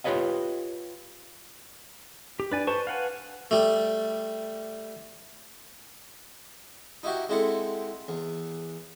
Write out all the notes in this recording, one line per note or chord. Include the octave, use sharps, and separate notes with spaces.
F4 G4 B4 C#5 D#5 F5
G4
D4 B4 D5 G#5
B4 C5 A5 C#6
F5 F#5 G#5
G3 A3
D#4 E4 F#4 G4
G#3 C4 E4 A4 F#5
E2